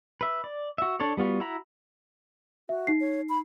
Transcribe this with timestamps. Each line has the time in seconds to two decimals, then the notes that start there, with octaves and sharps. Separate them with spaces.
0.21 B4 E5
0.44 D5
0.78 F#4 E5
1.00 D4 A4 C#5 D5
1.17 G3 B3 F4 F#4
1.40 E4 F#4 F#5 A#5 B5
2.69 F#4 E5
2.87 D#4 C7
3.00 C#5
3.29 B5